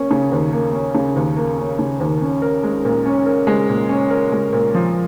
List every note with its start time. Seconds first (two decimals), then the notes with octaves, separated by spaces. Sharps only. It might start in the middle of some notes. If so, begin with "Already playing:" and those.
Already playing: A#3 C#4
0.11 C#3
0.32 D#2
0.52 A#3
0.73 C#4
0.95 C#3
1.16 D#2
1.36 A#3
1.58 C#4
1.79 C#3
2.00 D#2
2.21 C#4
2.42 A#4
2.63 G#3
2.85 A#2
3.06 C#4
3.26 A#4
3.47 G#3
3.69 A#2
3.89 C#4
4.10 A#4
4.32 G#3
4.53 A#2
4.74 F3